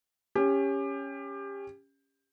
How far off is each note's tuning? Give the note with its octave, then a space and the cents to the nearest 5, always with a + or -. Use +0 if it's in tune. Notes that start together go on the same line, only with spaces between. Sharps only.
C#4 +0 G4 +25